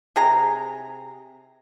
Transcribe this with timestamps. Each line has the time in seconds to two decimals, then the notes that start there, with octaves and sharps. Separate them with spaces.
0.16 C3 G#4 A#5